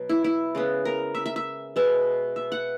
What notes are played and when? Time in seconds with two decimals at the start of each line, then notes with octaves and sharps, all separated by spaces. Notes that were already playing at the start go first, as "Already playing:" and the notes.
Already playing: B2 F#3
0.09 E4
0.24 E4
0.55 C#3 G#3 B3
0.85 A#4
1.15 E5
1.26 E5
1.36 E5
1.76 B2 G#3 B3 E5
2.36 E5
2.52 F#5